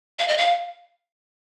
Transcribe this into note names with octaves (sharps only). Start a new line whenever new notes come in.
F5
D#5
F5